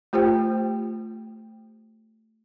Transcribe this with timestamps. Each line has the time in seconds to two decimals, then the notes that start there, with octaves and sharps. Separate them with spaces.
0.13 A3 F4 G4 C5 G5